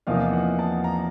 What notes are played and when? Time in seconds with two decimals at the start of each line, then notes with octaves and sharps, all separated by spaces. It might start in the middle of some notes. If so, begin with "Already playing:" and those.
0.07 E2 C3 F3 A#3 D#4 F5
0.33 F#5
0.59 A5
0.84 A#5